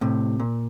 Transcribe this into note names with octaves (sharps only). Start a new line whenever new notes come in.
A2 C3
A#2